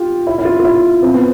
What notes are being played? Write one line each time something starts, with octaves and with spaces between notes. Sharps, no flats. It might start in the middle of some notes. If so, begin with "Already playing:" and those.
Already playing: F4 G4
E4
E4
F4
F4
E4
C4
B3